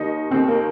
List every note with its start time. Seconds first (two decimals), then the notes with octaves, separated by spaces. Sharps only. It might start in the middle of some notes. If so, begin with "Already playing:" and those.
Already playing: D#2 D#3 D#4
0.30 D#2 D#3 C4
0.48 A#3